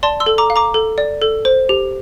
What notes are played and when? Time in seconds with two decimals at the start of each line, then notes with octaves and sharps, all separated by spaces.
0.03 D5 A5 C6
0.20 C6 E6
0.26 A4
0.38 A#5 D6
0.50 F5
0.56 A#5 D6
0.74 A4
0.98 D5
1.22 A4
1.45 C5
1.69 G4